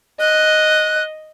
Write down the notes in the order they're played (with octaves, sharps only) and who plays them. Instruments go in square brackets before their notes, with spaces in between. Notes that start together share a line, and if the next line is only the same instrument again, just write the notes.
[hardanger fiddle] D#5 [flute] F#6